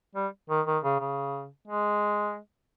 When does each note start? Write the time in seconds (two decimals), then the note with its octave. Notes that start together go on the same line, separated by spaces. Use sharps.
0.15 G3
0.50 D#3
0.66 D#3
0.83 C#3
1.00 C#3
1.68 G#3